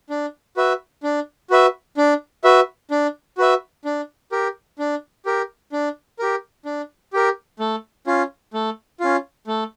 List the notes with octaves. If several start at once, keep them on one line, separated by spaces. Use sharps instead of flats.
D4
F#4 B4 E5
D4
F#4 B4 E5
D4
F#4 B4 E5
D4
F#4 B4 E5
D4
G4 A#4
D4
G4 A#4
D4
G4 A#4
D4
G4 A#4
A3
C#4 F4
A3
C#4 F4
A3